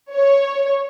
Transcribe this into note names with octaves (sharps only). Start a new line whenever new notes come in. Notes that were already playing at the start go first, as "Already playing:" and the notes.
C#5